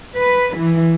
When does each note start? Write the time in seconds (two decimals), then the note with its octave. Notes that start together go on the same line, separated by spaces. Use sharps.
0.15 B4
0.56 E3